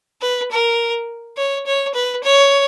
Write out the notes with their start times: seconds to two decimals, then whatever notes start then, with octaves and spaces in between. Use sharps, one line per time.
0.21 B4
0.51 A#4
1.37 C#5
1.66 C#5
1.94 B4
2.24 C#5